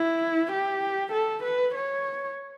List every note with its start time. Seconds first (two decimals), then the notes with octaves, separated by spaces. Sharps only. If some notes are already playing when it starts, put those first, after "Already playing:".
Already playing: E4
0.52 G4
1.12 A4
1.43 B4
1.74 C#5